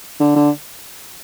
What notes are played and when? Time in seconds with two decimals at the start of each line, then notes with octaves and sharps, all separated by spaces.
0.20 D3
0.36 D3